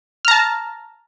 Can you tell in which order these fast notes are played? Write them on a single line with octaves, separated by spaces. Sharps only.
F6 A#5 A5